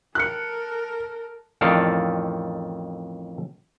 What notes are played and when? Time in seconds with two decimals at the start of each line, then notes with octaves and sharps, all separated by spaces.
0.15 A4 A#4 F#6 C#7
1.61 A1 F2 D#3 A4 D5 F5